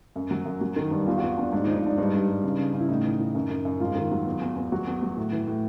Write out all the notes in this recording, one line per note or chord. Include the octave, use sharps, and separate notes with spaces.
F#2
F#3
F#2
F#3
D#3
G2
E2 F4
F#4
E2 F4
E2 D4
G#2 D4
D#4
F3
D#4
G#2 D4
G2 D#4
G2
G2
C#3
C#3
C#3
E4
A2 D#4
E3
E3
F#2
F#2
F#2
G#2 F4
D#3
F#3
E2
E2
E2
F#3 F#4
E2
F#3
A2
E3
A2